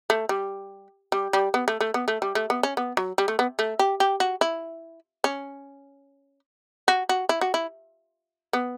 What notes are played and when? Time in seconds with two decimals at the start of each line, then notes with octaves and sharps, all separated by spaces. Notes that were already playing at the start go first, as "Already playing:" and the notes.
0.10 A3
0.29 G3
1.12 G3
1.33 G3
1.54 B3
1.68 A3
1.81 A3
1.94 B3
2.08 A3
2.22 G3
2.35 A3
2.50 B3
2.63 C#4
2.77 B3
2.97 F#3
3.18 G3
3.28 A3
3.39 B3
3.59 A3
3.79 G4
4.00 G4
4.20 F#4
4.41 E4
5.24 C#4
6.88 F#4
7.09 F#4
7.29 E4
7.41 F#4
7.54 E4
8.53 B3